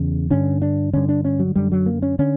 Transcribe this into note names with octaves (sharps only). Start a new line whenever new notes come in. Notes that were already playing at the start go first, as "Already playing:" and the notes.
Already playing: E2 C#3
G2 D3 C#4
D4
G2 D3 C#4
D4
C#4
F#3
F#2 D3 G3
F#3
A#3
C#4
D3 C#4